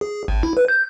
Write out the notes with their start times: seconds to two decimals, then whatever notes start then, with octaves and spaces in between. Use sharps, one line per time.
0.01 G#4
0.28 G#1
0.43 E4
0.57 B4
0.68 G6